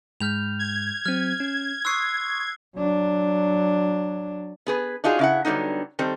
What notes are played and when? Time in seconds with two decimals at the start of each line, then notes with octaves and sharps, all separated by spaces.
0.20 G#2 G#3 F6 G6 F7
0.59 G#6
1.06 F#3 C4 F6
1.40 C#4
1.85 C6 C#6 D#6 E6 F#6 C7
2.76 F#3 D4
4.67 B3 G#4 B4
5.04 D4 D#4 F4 F#4 G#4
5.19 C#3 E4 F#5
5.45 D3 F#3 G3 B3 D#4
5.99 D#3 G3 C4 A4